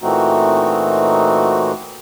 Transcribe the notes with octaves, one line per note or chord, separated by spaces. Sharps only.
A#2 E3 A3 C4 D#4 F#4